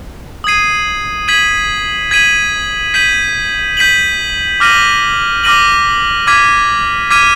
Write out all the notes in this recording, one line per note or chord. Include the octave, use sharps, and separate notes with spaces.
D#6 G#6 C7 D#7
G#6 B6 D#7 F#7
G#6 B6 D#7 F#7
G6 B6 D#7 F#7
G6 B6 D#7 F#7
D6 F6 A#6 D#7 F#7
D6 F6 A#6 D#7 F#7
D6 F6 G#6 B6 D#7
D6 F6 G#6 B6 D#7